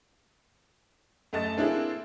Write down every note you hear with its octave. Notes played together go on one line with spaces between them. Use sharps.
F#2 A3 D#5 A5 A6
A#3 C4 D4 E4 G#4 A4